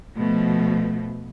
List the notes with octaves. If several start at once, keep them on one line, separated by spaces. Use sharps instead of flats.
B2 F3 A3